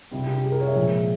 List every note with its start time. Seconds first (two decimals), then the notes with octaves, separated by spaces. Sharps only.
0.11 C3 G3 C4
0.27 G4
0.43 G#4
0.52 A#4
0.60 C#5
0.67 E5
0.75 A#2 F3 G#3